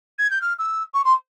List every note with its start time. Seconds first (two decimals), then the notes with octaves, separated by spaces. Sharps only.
0.18 G#6
0.30 G6
0.41 F6
0.59 E6
0.94 C#6
1.05 C6